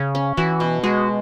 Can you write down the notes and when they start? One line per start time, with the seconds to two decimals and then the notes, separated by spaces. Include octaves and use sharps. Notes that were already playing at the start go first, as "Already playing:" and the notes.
Already playing: C#3
0.15 C#4
0.37 E3 F#4
0.60 B2
0.84 G#3 F#4